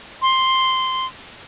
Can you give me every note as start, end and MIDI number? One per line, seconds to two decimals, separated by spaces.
0.22 1.06 84